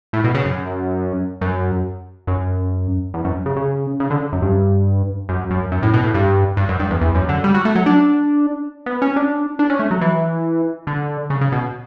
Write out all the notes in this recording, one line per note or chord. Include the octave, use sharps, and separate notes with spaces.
A2
B2
C#3
F#2
F#2
F#2
E2
F#2
C#3
C#3
C#3
D3
F#2
G2
F#2
F#2
F#2
A2
B2
A2
G2
G2
F#2
G2
E2
E2
F#2
D3
G3
F#3
A3
F#3
D4
B3
C#4
D4
D4
C#4
A3
F#3
E3
D3
C#3
C#3
B2